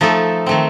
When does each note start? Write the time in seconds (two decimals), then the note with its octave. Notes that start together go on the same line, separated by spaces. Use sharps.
0.01 F3 A3 D#4 A4
0.46 D#3 A3 C4